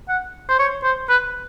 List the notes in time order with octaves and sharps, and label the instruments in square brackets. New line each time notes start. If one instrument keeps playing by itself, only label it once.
[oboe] F#5
C5
C#5
C5
B4